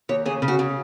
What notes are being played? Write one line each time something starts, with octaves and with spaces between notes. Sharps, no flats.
D#2 C#5
C#3 G#4
C#3
F#4
C#3